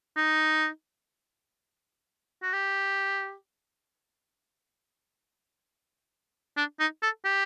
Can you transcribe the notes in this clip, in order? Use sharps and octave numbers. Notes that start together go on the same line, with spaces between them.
D#4
F#4
G4
D4
D#4
A4
G4